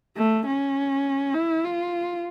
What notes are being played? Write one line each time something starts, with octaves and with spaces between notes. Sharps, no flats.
A3
C#4
E4
F4